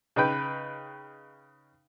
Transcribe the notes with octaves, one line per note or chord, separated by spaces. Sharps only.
C#3 D#4 B4 G5